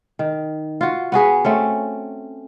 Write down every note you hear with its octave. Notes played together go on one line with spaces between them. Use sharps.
D#3
F4 F#4
B3 F#4 G#4 B4
A3 C4 C#4